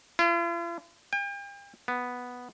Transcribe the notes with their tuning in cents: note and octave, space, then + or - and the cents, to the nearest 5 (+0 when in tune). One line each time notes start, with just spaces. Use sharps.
F4 -45
G5 +40
B3 +0